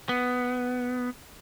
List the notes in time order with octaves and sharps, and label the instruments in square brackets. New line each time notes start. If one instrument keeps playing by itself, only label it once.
[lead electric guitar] B3